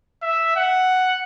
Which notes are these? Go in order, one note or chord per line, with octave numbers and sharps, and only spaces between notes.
E5
F#5